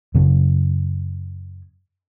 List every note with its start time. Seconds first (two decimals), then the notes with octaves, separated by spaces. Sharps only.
0.15 F#2 C#3 F#3